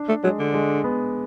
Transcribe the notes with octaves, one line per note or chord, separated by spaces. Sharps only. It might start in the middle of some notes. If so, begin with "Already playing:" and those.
Already playing: D4
A3
F#3 G#3
D3
G#3
B3